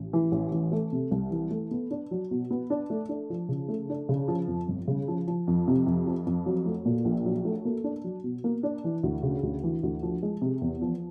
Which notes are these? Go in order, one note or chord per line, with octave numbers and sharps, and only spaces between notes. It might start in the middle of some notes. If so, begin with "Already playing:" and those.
Already playing: A1
E3
A1
E3
A3
C3
C2
E3
A3
B3
D4
F#3
B2
B3
D4
A3
D4
F3
C#3
A3
D4
C#3
F3
F2
G1
C#3
F3
F3
F2
C3
F2
F3
F2
F#3
A3
A#2
A#1
F#3
A3
A#3
D4
F#3
B2
A#3
D4
E3
D2
C#3
D2
E3
D2
F3
G#3
C3
E2
F3